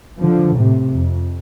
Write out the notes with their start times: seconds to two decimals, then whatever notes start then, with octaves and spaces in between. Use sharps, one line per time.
0.21 D3 F3
0.59 A2 C3
0.94 F2